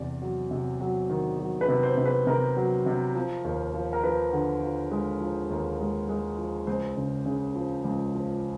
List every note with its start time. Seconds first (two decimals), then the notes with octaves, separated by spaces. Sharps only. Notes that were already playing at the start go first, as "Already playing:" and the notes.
Already playing: E2 C3 D5
0.22 F#3
0.51 C3
0.80 F#3
1.10 D#3
1.39 F#3
1.61 B4
1.68 C3
1.83 C5
1.98 C3
2.06 B4
2.27 C3 A#4
2.57 F#3
2.86 C3
3.15 F3
3.45 D#2
3.74 F3
3.93 A#4
4.03 F3 B4
4.33 D3
4.62 F3
4.91 G#3
5.21 F3
5.50 D#2
5.80 G#3
6.09 G#3
6.38 F3
6.67 C#2 C5
6.97 C#3
7.26 C#3
7.56 F3
7.85 C#2
8.14 F3